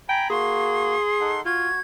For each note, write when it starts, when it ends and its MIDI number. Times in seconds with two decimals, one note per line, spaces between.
0.09 0.26 79
0.09 0.30 80
0.09 0.30 82
0.09 0.30 83
0.30 0.95 58
0.30 0.95 66
0.30 1.39 68
0.30 1.43 84
1.21 1.41 63
1.21 1.41 69
1.21 1.41 78
1.45 1.69 65
1.45 1.79 66
1.45 1.82 92